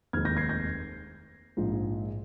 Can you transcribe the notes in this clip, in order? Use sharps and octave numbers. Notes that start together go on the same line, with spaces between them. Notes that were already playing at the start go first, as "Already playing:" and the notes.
F1 D#2 D#3 G#3 C4 F6 G#6
G6 A#6
G#6 C7
G6 A#6
A#1 G#2 F3